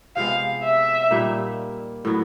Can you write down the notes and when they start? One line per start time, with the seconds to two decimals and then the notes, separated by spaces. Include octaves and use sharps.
0.16 C3 F3 G#3 B3 F5
0.63 E5
1.11 A#2 G3 A#3 D#4
2.05 A2 F#3 B3